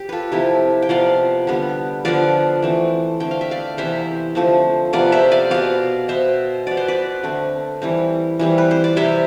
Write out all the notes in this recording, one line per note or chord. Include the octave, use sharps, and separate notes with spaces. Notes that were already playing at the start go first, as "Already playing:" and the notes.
Already playing: G4
F4 A4 B4
C3 F3 C4 E4 G4
G5
C3 F3 B3 D5 F5
D3 G3 B3
D3 F3 B3 D5 F5
E3 A3 C4
D3 A3 C4 G5
F5
E5
D5 F5
C3 E3 B3 C5 E5
D3 F3 A3 C4
C3 F3 B3 D5 F5
C5 E5
D5 F5
B2 B3 D5 F5
B2 B3 C5 E5
B2 B3 D5
C5
B4 D5
D3 A3 C4
E3 G3 C4
E3 G3 C4
B4
C5
D5
C3 G3 C4 C5 E5